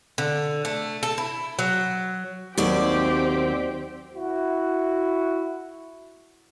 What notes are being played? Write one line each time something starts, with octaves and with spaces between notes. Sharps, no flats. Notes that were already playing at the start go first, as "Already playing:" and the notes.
D3
A3
A4
E4
F#3
D#2 F#3 C4 G4 D5
E4 F#4